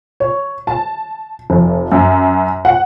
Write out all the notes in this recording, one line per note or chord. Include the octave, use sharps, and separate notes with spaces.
C#5
A5
F1
F#2
F#5